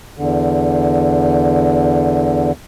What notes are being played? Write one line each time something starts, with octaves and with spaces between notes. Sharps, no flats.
E2 D3